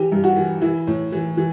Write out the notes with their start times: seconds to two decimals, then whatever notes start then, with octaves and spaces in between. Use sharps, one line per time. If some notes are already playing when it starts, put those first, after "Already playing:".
Already playing: E3 G4
0.12 G2
0.24 F#4
0.36 E3
0.62 E3 E4
0.87 A2
1.12 E3
1.37 E3